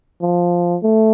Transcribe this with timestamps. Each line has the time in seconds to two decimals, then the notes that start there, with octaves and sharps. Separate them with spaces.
0.22 F3
0.83 A3